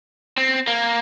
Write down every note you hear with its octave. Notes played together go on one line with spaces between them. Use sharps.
C4
A#3